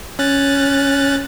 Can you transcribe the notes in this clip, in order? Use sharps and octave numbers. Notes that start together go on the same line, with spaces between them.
C#4 F#6 A6